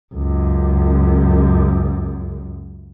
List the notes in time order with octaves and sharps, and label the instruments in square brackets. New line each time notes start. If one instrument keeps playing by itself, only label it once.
[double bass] C#2 F#2